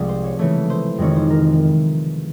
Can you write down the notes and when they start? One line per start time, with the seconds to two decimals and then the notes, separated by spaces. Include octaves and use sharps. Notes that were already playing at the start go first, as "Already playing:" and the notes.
Already playing: C2 C3 F3 G#3 G#4
0.09 C5
0.24 C#5
0.39 C#3 E3 A3 C#5
0.70 C5
0.98 F2 C3 D#3 G#3 C4 C#5
1.16 C5
1.30 A#4